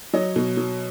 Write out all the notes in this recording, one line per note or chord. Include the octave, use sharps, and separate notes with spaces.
F#3 C#5 D#5
B2
F#3